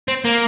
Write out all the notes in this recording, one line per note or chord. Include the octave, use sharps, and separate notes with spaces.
C4
A#3